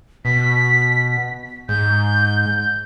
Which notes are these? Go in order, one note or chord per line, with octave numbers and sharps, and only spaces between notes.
B2 B6
G#2 G6